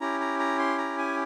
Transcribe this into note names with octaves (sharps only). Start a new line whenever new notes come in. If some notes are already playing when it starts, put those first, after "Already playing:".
C#4 E4 G4 A#5
A#5
A#5
C6
A#5
G#5